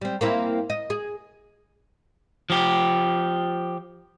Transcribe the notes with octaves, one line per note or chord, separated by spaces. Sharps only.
G3 C4
A#3 C4 E4
D#5
G#4
F3 G4